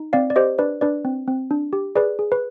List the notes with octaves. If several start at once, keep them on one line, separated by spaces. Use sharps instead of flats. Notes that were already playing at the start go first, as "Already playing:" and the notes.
Already playing: D#4
C4 D5 F5
D5
G4 C5 D#5
D4 B4 D5
D4 B4 D5
C4
C4
D4
G4
G#4 B4 D5
G#4
B4